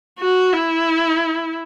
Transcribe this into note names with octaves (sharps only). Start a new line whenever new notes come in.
F#4
E4